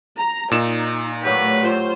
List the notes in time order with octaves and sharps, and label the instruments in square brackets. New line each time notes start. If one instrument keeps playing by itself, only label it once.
[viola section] A#5
[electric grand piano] A#2 E7 [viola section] D#4
[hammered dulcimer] A2 F#3 G4 [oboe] B4
[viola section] F4 C5